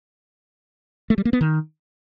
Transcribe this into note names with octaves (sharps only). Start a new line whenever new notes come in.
A3
G3
A#3
B3
D#3